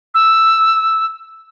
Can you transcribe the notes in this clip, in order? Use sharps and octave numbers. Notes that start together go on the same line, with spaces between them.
E6